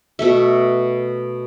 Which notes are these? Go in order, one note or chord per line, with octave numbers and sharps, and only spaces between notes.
B2 A3 E5